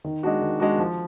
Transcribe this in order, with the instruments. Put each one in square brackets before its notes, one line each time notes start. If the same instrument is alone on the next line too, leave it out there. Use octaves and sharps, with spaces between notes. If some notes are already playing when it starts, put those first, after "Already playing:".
[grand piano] D#3
G#3 D4 F#4
D#3
G#3 D4 F#4
F3